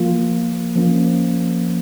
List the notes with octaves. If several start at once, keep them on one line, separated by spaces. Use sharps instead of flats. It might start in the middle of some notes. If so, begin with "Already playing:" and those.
Already playing: F3 A#3 F4
F3 A#3 C#4